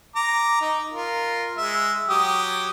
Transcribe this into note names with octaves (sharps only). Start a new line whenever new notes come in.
A#5 D6
D#4
F4 A#4
G#3 E5
F#3 G4 D#6